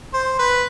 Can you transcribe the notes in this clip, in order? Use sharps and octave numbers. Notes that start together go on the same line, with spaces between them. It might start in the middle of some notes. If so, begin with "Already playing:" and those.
C5
B4